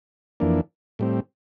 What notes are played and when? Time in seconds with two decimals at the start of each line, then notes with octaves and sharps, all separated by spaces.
0.40 F2 E3 A#3 D4
0.99 A2 G3 C4